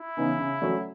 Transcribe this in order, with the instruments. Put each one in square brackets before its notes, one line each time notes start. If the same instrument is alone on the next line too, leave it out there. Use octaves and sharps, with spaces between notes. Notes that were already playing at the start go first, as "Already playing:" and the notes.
Already playing: [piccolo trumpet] E4
[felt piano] C#3 E3 B3 D#4
C#3
F#3 A3 C#4